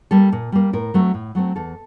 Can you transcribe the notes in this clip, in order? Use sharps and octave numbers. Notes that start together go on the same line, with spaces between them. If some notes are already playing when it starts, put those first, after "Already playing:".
G3 A#3 A4
A#2
G3 A#3
A2 A#4
F#3 A3 C4
A2
F#3 A3 C4
E2 A4